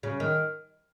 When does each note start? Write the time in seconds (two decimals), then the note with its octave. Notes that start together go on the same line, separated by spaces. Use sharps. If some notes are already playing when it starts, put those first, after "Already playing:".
0.03 C#3
0.20 D#3